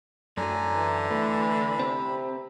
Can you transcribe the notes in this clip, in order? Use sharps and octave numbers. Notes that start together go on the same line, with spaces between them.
F#2 A2 D3 F#3 G#5 A#5
E3
D2 G#2 E3 A3 B5
C3 C4